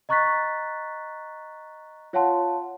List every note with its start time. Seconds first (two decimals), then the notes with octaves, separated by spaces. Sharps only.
0.09 D#5 A#5 C#6 F#6 A6 B6
2.13 F4 C#5 F5 F#5 A5 C6